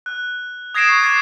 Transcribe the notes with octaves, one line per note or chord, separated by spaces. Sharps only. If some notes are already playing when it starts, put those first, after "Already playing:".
F#6
D#6 G#6 A#6 C7 D7 E7
C#6 F7
D6 F#6 G#6 A6 C7